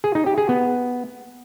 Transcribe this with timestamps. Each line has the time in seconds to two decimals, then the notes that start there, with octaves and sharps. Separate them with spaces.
0.04 G#4
0.15 D#4
0.26 G4
0.38 G#4
0.49 B3